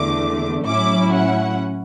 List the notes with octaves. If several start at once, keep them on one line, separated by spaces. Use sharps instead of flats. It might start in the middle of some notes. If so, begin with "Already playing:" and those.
Already playing: E2 D3 A3 D6
A2 F#3 C#4 E4 D6
F#5